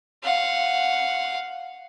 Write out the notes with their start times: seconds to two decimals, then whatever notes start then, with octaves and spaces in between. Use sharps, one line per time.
0.24 F5 F#5